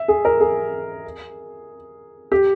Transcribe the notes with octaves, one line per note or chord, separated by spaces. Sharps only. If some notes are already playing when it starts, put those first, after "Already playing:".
Already playing: E5
G#4
A#4
G#4
G4